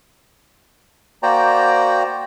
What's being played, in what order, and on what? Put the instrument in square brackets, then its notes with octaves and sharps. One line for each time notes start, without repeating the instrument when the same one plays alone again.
[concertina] A#3 F#4 C5 D5 G5 A#5